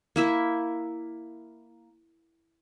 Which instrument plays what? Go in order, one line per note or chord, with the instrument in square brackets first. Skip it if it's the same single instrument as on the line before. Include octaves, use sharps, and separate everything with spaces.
[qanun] A#3 E4 E5